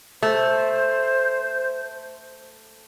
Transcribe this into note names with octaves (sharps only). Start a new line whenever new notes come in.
A3 C5